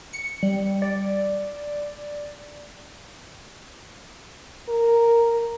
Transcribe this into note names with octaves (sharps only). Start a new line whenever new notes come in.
C#7
G3
D5
A#4